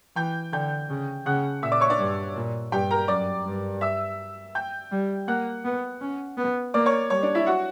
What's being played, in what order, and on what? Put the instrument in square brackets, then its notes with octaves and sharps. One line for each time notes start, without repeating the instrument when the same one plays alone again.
[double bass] E3 [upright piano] G5 G6
[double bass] D3 [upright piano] G5 G6
[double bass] C#3
[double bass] C#3 [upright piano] F#5 F#6
[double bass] A#2 [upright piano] E5 E6
[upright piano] D5 D6
C#5 C#6
D4 D5
[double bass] G2
A#2
[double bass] G2 [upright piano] G4 G5
[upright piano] A#4 A#5
[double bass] F#2 [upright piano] D5 D6
[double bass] G2
[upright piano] E5 E6
G5 G6
[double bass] G3
[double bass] A#3 [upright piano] F#5 F#6
[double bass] B3
C#4
B3
[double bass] A#3 [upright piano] D5 D6
[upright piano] C#5 C#6
[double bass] G3 [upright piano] C#5
[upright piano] D4 D5
E4 E5
F#4 F#5